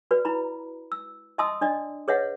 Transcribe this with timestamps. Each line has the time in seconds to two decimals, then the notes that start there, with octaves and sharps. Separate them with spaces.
0.11 F#4 B4 D5
0.25 E4 A#5 B5
0.92 E6
1.38 D#5 E5 A5 C6 D#6 E6
1.61 D4 D5 D#5
2.08 G#4 B4 C#5 D#5 E5 F#5